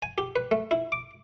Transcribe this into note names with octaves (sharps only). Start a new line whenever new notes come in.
G#5
G4
B4
A3
E4
D6